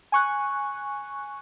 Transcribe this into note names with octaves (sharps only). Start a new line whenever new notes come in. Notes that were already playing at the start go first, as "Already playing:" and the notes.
G#5 C#6 F#6